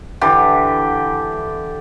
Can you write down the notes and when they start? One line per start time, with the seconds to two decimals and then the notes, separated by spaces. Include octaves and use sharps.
0.21 D3 E3 G4